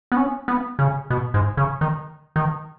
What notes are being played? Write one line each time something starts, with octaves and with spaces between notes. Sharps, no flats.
B3
C#4
B3
C#3
B2
G#2
C#3
D#3
D#3